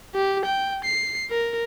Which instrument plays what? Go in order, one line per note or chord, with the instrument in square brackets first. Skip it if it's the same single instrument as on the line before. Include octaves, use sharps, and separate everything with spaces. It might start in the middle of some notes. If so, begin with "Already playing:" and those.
[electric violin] G4
G5
C7
A#4